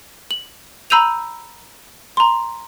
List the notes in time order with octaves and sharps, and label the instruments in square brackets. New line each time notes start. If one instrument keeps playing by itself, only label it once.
[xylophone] F#7
A#5 B5 E6 G6 D#7 F7
A#5 C6